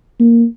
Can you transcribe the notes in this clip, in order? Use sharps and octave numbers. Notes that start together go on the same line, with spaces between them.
A#3